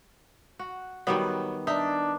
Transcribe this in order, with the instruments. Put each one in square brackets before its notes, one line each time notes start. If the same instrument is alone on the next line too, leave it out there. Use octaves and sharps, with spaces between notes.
[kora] F#4
[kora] D#3 G3 B3 [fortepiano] F#3
[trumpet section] D4 [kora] D#4 [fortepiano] E5